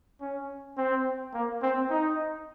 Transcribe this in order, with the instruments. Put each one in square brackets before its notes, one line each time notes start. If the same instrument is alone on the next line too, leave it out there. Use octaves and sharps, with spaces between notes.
[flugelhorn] C#4
C4
A#3
C4
D#4